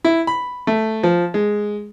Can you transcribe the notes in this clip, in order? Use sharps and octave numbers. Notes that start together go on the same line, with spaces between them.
E4
B5
A3
F3
G#3